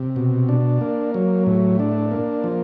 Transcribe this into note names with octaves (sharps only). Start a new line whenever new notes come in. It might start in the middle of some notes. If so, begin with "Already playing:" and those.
Already playing: C3
B2
D4
A#3
F#3
A2
D4
A#3
F3